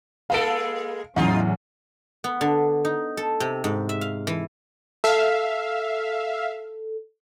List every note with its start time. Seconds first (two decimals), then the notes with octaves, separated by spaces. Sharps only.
0.30 G#3 A#3 A4 F5 D7
1.16 E2 A2 F#3 C#4 D#4 F4
2.24 B3
2.41 D3
2.85 D#4
3.17 A4
3.40 C3
3.64 G#2
3.89 E5
4.01 F5
4.27 E3
5.04 A4 E5 F5